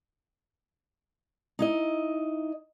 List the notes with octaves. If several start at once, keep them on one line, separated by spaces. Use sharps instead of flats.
D#4 E4 D#5